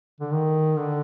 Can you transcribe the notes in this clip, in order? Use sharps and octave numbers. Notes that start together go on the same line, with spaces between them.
D3
D#3
D3